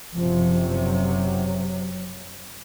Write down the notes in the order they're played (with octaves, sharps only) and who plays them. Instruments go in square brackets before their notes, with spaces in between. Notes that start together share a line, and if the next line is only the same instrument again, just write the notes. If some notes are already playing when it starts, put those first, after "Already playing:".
[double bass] F#1 C3 [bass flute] F3
[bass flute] F#3